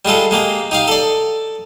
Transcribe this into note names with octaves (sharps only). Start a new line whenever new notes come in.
G3 G#3 F4 A4
G#3 A#3 G4
D#4 G4 F5
A4 D5